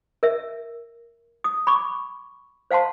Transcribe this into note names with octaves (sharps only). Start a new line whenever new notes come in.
A#4 E5
D#6
B5 C#6 D6
C5 F5 F#5 A5 C6